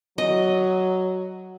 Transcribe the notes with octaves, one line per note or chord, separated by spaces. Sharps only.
F#3 D#5